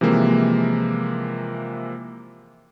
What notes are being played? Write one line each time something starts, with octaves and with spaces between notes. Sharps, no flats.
C3 E3 F3 G#3 A#3